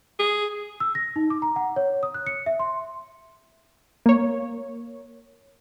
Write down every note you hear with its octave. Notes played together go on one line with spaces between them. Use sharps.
G#4
E6
A#6
D#4
D6
A#5
F#5
C#5
D#6
F#6
C#7
E5
C6
A#3 C#5